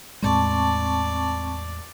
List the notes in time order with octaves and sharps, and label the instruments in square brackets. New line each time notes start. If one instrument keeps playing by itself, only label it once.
[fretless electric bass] E2 A2 G#3 [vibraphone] C4 A5 C#6 [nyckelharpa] D5